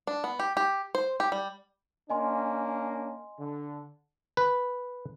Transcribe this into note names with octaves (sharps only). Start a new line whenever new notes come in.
D4
B3
G4
G4
C5
G4
G3
A#3 C#4 D4 D#5 G#5 C6
D3
B4